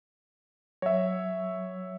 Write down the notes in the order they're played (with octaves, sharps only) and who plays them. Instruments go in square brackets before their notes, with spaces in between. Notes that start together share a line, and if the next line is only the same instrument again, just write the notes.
[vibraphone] F#3 [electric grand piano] C#5 E5